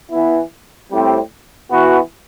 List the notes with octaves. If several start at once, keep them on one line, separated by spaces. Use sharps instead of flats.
E3 B3 E4
A2 G3 C4 G4
E3 B3 F#4